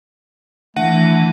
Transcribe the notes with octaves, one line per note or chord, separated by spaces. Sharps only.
D#3 E3 A3 D4 F#5